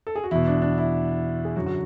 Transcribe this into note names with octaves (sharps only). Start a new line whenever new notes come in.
A4
G#4
F#4
E2 B2 E4
D4
D4
E4
G#4
F#2 D3 F#4
F#4